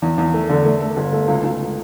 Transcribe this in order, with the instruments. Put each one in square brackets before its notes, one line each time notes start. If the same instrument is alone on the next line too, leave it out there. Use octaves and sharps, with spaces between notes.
[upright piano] E2
E2
A3
D3
A3
A3
G1
A3
C#2
C#2